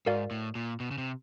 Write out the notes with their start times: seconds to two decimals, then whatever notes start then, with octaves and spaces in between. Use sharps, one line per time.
0.06 G#2 F#4 A#4 D5 F5
0.31 A2
0.55 A#2
0.80 B2
0.91 C#3
0.98 C3